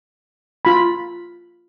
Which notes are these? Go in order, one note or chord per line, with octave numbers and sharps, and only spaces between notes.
F4 B5